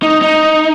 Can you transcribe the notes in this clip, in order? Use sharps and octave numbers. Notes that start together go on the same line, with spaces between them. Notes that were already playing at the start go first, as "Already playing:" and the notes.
D#4
D#4